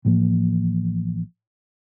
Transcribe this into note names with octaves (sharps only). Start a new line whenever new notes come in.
A1 A2 F3 A#3